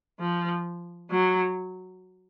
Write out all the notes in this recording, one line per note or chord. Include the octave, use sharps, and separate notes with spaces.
F3
F#3